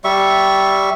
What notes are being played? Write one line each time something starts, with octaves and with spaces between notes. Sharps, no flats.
G3 E5 C#6